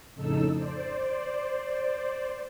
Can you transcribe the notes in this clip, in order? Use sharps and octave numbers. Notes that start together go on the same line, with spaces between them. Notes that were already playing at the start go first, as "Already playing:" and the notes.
F2 A2 C#3 D#4 A4 E6
C5 D5